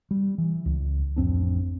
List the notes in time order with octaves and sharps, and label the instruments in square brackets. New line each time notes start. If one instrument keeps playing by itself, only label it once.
[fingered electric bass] G3
E3
C#2
A1 F2 C4 D4